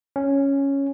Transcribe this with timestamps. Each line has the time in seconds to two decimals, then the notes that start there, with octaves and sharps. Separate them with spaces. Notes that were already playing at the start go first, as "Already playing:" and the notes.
0.16 C#4